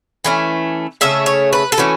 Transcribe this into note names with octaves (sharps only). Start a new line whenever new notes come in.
E3 A3 C#4
C#3 A3 C#4 E5
C#5
B4
A4
E3 A3 C#4 F#4